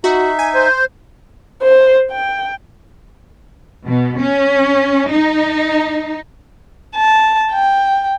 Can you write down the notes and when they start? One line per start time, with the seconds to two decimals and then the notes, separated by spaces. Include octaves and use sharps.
0.04 D#4 F#4 E5
0.39 G#5
0.55 C5
1.63 C5
2.11 G5
3.86 B2
4.19 C#4
5.09 D#4
6.96 A5
7.52 G5